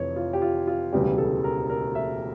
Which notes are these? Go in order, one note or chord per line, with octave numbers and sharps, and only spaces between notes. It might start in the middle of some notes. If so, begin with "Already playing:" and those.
Already playing: F1 F2 E3 C#5
F4
G4
F4
F4
E1 D2 C#3 E3 G3 G4
A4
A#4
A#4
E5